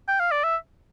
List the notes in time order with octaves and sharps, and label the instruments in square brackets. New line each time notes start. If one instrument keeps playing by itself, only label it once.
[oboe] G5
F5
D5
E5